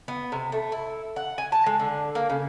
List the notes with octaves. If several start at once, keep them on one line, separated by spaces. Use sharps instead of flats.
B3
C3
A3
E4
F#5
G#5
A5
G#3
D3
A#3
C#3